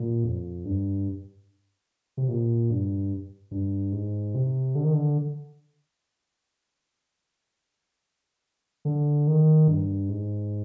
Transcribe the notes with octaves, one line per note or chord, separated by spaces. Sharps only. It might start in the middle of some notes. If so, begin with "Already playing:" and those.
Already playing: A#2
F2
G2
C3
A#2
G2
G2
G#2
C3
D3
D#3
D3
D3
D#3
G2
G#2